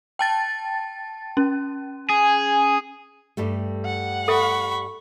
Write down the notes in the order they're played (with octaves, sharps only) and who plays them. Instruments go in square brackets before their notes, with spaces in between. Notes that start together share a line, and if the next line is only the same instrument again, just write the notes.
[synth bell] G5 A5 A6
C#4
[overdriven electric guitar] G#4 [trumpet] G#5
[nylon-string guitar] G2 G3 A3
[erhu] F#5
[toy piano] A4 E5 [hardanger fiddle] B5 C#6